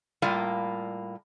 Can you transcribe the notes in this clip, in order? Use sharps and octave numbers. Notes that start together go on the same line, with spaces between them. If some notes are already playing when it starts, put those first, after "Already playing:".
A2 G3 A#3 F4